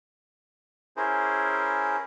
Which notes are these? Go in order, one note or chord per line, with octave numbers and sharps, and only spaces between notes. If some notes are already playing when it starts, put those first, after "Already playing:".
C#4 E4 G#4 A#4 C5